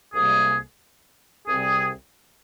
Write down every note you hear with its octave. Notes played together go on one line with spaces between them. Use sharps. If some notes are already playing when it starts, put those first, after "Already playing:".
C2 C3 G3 A#3 G#4
C2 C3 G3 C4 G#4